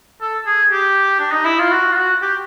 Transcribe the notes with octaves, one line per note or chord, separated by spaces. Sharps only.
A4
G#4
G4
D4
D#4
E4
F4
F#4
F4
F#4
G4